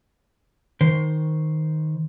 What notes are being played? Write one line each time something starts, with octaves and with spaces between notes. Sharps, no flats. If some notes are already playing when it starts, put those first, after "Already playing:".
D#3 C5